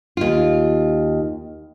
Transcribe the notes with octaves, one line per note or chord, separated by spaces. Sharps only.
D#2 F4